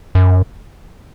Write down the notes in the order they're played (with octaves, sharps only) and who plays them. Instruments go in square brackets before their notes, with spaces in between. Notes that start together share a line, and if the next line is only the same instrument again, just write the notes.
[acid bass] F#2